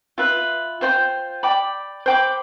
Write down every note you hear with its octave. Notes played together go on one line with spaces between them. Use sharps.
F4 B4 E5
F4 C5 G5 C6
D5 G5 B5 D6
C5 G5 B5 D6